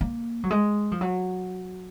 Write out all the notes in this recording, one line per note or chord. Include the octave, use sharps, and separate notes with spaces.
A#3
F#3
G#3
F3
F#3